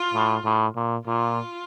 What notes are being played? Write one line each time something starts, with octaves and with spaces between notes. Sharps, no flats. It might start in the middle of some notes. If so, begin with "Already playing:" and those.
Already playing: F4
A2
A2
A#2
A#2 F4